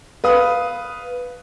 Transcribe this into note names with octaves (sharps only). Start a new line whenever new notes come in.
B4 F5 D#6